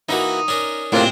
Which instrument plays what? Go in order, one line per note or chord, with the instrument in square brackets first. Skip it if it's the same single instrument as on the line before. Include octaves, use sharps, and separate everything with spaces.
[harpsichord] E3 A#3 F#4 [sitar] D#4
[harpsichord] C#4 D4 A#4
[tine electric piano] A2 A#3 F4 [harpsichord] C3 D4 [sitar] G#3 C4